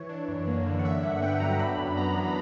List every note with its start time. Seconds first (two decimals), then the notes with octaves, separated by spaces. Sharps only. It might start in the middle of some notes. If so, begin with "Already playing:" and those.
Already playing: E3 C#5
0.09 D4
0.28 F#2
0.47 A#3
0.66 D3
0.79 F#5
0.84 D4 E5
1.03 G2 F#5
1.22 B3 G5
1.40 F#3 A#5
1.59 D4 B5
1.78 F#2
1.97 B3 A#5
2.16 E3